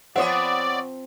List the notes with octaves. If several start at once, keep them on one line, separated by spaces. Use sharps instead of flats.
F3 B3 C4 C#5 D5 E5 F#5 D#6